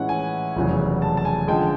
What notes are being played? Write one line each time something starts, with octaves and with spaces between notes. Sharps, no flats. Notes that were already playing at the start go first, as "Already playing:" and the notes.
Already playing: A2 E3 G#3 C#4 E4 F#5
G#5
F1 E2 C#3 F#3
A5
A5
G#5
D3 F3 G#3 G5